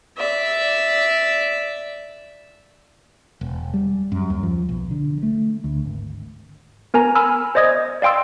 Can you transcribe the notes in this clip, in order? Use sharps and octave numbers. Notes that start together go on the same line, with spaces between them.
D5 E5
E1
G3
F#2
D#2
F3
B1
D3
A3
D2
G#1
B3 A#4 G#5 A#5
G#5 B5 E6 F6
C5 D5 D#5 D#6 G#6
D5 F5 G5 C6 E6